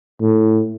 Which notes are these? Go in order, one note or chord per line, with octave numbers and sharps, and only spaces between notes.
A2